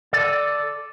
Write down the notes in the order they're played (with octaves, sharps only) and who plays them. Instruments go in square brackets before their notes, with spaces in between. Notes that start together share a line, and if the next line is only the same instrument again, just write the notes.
[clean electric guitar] A4 D5